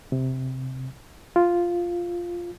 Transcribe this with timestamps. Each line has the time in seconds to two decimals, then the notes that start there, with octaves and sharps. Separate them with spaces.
0.12 C3
1.36 F4